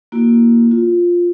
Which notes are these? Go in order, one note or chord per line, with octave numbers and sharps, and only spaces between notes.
A#3 E4 F#4
F4